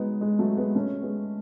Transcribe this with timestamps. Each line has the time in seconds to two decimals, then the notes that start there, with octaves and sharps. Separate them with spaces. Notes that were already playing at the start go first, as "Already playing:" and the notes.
Already playing: G#3 B3 D#4 F#4
0.21 G#3
0.39 F#3 A3
0.57 G#3 B3
0.75 A3 C#4
1.02 G#3 B3